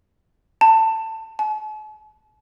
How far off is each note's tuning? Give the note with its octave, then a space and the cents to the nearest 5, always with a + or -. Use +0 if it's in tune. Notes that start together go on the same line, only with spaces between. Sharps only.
A5 +20
A5 -45